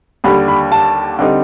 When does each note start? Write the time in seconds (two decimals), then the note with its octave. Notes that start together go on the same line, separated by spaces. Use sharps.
0.24 D#2 D3 G3 B5
0.48 B5
0.72 A5
1.19 D3 G3 C4 D#4